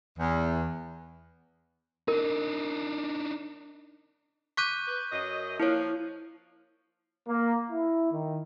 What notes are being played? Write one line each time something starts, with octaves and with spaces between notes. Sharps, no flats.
E2
D4 D#4 A#4
C#6 D6 F#6 G6 B6 D#7
B4
F#2 D#5
F3 A#3 E4 C#5
A#3
E4
D#3